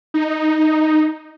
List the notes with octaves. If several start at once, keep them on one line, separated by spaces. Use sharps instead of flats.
D#4